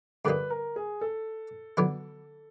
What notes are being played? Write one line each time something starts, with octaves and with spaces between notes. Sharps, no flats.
G2 D3 G3 A#3 D#4 B4
A#4
G#4
A4
D3 F#3 B3 E4